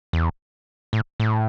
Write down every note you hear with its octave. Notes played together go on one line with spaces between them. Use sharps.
E2
A2
A2